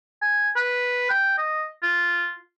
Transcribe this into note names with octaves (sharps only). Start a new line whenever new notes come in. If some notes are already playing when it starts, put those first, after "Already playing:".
G#5
B4
G5
D#5
F4